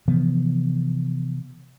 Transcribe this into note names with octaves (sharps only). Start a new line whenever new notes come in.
C3 E3 F3 B3